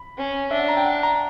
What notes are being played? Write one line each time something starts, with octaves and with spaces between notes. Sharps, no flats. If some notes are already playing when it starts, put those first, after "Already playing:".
Already playing: B5
C#4
D4 E5
F#5
A#5
G5
F#5
A#5